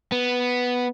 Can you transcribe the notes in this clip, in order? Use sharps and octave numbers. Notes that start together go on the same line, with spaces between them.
B3